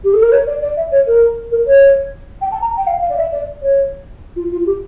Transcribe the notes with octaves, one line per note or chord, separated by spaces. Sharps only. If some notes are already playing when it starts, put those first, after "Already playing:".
G4
A4
A#4
C#5
D5
D5
E5
C#5
A#4
A#4
C#5
G5
A5
A#5
G5
F5
F5
D5
E5
D5
C#5
F4
F4
G4